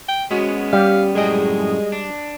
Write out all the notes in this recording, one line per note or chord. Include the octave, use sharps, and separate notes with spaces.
G5
G#3 B3 C#4 F#4
G3 G4 F5
F#2 A2 G#3 G#4 D#5 G5 D#6
D4